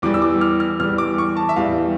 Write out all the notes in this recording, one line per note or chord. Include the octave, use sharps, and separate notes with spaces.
E2 E3 G3 D6
E6
D6
F6
F6
E2 E3 G3 F6
D6
C#6
A5
E5
E2 E3 G3 F5